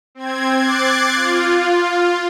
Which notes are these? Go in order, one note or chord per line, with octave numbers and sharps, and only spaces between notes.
C4 G#6
D6 F#6 G#6 A6 C7
F4